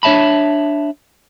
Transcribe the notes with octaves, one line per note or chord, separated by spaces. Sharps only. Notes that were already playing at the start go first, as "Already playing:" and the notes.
D4 C#5 E5 A5 B5